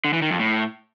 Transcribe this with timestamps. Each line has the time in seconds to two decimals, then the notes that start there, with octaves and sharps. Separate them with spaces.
0.05 D3
0.13 E3
0.22 D#3
0.31 F2
0.39 A2